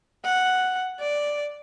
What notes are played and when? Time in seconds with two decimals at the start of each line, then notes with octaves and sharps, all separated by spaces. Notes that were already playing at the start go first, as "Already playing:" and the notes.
0.24 F#5
1.00 D5